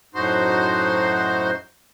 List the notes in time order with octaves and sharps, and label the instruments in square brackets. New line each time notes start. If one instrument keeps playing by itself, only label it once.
[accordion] F#2 A2 D#4 F#4 C5 C6